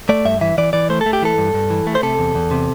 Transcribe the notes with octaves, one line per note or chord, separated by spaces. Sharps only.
A3 D5
G2 E5
E3 E5
E3 D5
E3 D5
A3 C5
A4
A3
G4
E3 A4
G2
G2
E3
A3
C5
C3 A4
E2
E2
C3